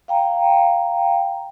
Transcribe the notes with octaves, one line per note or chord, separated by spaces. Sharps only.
F5 G5 A#5